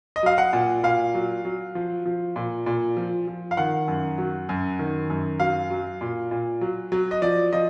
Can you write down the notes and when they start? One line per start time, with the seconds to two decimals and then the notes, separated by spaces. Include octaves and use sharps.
0.16 D#5
0.23 F#3 F5
0.38 F#5
0.53 A#2
0.84 A#2 F5
1.14 F#3
1.45 F#3
1.75 F3
2.05 F3
2.36 A#2
2.66 A#2
2.97 F3
3.28 F3
3.51 F5
3.57 D#3 F#5
3.88 F#2
4.18 F#3
4.49 F#2
4.79 D#3
5.10 F#2
5.40 F#3 F5
5.70 F#3
6.01 A#2
6.31 A#2
6.61 F#3
6.92 F#3
7.11 D#5
7.22 F3 D5
7.53 F3 D#5